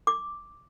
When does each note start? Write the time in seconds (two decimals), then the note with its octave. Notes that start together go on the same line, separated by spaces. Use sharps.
0.07 D6